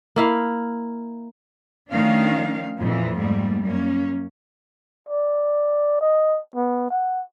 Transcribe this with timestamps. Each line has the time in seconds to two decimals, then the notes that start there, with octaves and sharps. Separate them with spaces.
0.16 A#3 E4 F5
1.90 D#3 F3 A3 C#4 D4 F5
2.79 F2 A#2 E3
3.17 G#2 G3 A3 A#3
3.65 F#2 A#3 C#4
5.09 D5
6.01 D#5
6.56 B3
6.90 F#5